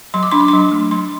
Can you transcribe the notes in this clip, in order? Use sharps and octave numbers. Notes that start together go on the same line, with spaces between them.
F#3 C6
D6
D4 C6
D6
F#3 C6
A3
F#3 C6